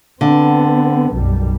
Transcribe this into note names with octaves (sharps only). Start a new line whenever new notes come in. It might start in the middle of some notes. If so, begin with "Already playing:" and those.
D3 B3 C4
B1 F#2 G3